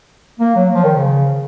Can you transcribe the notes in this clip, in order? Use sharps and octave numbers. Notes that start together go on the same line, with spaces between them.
A#3
F#3
F3
D#3
C#3